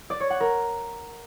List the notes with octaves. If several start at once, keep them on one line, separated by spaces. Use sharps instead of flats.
D5
C#5
F#5
A#4